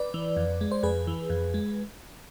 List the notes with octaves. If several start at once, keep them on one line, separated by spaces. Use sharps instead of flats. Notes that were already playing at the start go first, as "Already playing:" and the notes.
Already playing: B4 D5
E3
F2
G#3
C5
F2 G#4 B4
E3
F2
G#3